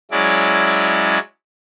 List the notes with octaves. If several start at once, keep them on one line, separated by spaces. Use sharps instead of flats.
F#3 G#3 C#4 E4 D5